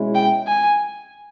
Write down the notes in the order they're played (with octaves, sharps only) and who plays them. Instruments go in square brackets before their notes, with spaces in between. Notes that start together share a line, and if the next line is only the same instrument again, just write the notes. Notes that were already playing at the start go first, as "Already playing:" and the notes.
Already playing: [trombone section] B2 G#3 C#4 E4
[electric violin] G5
G#5